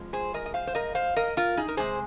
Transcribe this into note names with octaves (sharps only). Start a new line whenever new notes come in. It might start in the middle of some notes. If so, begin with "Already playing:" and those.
Already playing: F2 F3 G#3
G#4 C5
A#4 D#5
D#5
C5 F5
C5
A#4 D#5
C5 F5
A#4 D#5
F4 A#4
D#4 G#4
A#4
C3 G#3 G#4 C5